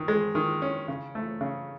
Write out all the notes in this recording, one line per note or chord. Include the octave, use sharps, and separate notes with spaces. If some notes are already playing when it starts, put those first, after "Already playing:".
Already playing: D#3
G#3
D#3
C#4
C#3
A3
C#3